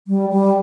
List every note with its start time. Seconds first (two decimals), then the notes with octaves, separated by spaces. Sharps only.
0.07 G3
0.30 G3